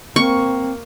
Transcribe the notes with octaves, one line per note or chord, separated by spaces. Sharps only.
A#3 C4 C#6